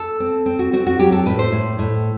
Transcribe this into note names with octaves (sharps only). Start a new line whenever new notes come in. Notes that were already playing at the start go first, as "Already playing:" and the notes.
Already playing: A4
C4
C4
F#4
C4 F#4
F#4
F#3 G4
A4
A2 B4
C5
A2
A2